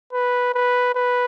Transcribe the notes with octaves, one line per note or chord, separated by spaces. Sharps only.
B4
B4
B4